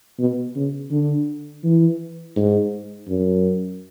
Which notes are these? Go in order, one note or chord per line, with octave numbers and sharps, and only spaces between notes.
B2
C#3
D3
E3
G#2
F#2